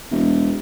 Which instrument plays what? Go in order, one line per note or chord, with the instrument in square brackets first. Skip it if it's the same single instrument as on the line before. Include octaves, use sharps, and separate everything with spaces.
[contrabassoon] E1